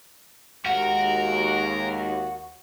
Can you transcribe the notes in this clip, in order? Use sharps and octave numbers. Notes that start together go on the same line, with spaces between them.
D#2 G#3 F#4 A#4